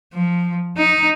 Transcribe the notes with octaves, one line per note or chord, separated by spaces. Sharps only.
F3
D#4